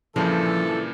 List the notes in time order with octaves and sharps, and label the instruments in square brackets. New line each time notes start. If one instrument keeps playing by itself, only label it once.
[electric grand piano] G2 A#2 C#3 [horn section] E3 A4 [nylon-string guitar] F3